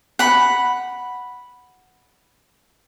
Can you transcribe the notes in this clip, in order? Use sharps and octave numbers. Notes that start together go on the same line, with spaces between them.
F#5 B5